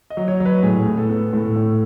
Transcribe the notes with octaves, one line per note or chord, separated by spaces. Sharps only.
D#5
F#3
C#5
F#3
B4
A2 G#4
A2
A4
B3
A2 A4
A2